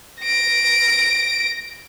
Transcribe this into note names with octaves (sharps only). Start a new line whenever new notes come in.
A#6 D7